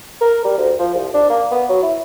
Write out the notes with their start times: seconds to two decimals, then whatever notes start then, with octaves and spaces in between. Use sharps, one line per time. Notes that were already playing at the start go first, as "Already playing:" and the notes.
0.21 A#4
0.44 G3
0.58 D2
0.79 F3
0.94 C2
1.14 D4
1.30 A#3
1.51 B3
1.69 F#3
1.83 E4